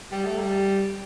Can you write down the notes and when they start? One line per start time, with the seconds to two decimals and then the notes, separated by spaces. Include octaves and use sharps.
0.12 G3
0.25 A3
0.39 G3